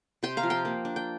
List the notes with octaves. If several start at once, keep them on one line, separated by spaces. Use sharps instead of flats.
C3 G5 C6
F5 A#5
F3
G5 C6
A#3
D4
G5